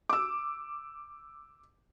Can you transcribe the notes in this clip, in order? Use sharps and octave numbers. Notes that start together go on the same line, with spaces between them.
D6 E6